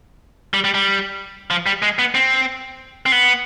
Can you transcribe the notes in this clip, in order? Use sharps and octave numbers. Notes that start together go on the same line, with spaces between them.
G3
G3
G3
F3
G3
G#3
B3
C4
C4
B3